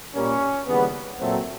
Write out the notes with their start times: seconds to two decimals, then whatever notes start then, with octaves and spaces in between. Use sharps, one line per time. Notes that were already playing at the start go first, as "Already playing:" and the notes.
0.15 A#2 G3 A#3 C#4
0.67 D#2 C#3 E3 G3 B3
1.19 A#2 F#3 A3 C4